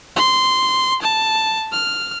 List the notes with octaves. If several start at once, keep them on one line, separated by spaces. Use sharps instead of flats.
C6
A5
F6